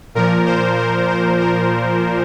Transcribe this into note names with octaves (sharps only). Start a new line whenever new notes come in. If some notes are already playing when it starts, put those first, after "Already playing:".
A#2 F3 A#4
C5
A#4
C5
A#4